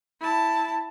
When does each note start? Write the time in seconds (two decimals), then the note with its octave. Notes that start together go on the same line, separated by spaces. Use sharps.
0.20 E4 A5